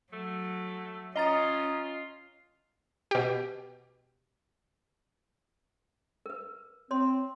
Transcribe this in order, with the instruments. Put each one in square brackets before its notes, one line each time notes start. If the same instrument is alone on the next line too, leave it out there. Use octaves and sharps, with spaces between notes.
[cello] F#3 [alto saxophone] A3
[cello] C#4 [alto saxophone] F4 [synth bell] D#5 A#5 A6 [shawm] D#6
[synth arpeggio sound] B2 G4
[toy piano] A#4 B4
[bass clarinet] C4 [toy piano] C#5 C6